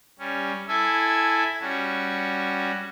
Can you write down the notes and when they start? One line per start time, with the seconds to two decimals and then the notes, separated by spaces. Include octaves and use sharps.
0.19 G3 C#4
0.68 E4 A4 E5 G#5
1.61 G3 C#4 F#4